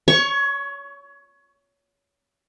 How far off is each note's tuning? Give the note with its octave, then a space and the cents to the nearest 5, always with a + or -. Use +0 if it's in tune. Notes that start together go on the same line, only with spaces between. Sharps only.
C#5 +25 C#6 +0